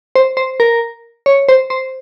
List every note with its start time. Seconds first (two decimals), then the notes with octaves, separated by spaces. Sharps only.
0.16 C5
0.37 C5
0.60 A#4
1.26 C#5
1.48 C5
1.70 C5